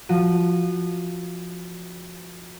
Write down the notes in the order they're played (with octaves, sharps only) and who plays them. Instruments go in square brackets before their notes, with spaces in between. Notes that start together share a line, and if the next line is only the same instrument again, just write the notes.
[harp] F3 F#4 D#7